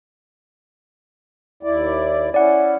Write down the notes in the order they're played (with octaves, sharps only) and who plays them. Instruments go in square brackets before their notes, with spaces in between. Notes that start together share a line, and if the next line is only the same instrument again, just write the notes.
[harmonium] D#2 E4 D5
[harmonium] C#4 E4 [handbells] D5 F#5